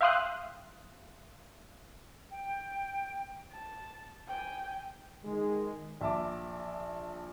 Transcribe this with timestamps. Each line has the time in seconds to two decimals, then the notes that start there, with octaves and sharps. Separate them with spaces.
0.01 E5 F5 G5 C6 D#6 F#6
2.31 G5
3.52 A5
4.27 G5 G#5
5.25 D#3 G#3
6.01 A#1 E5 A5 D6